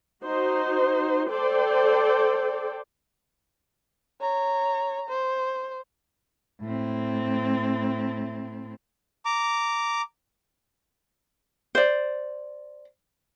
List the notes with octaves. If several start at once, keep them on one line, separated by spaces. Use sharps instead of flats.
D#4 F#4 C5
A4 C5 D5 G5
C#5 A#5
C5
A2 C4
A#5 D6
C5 D5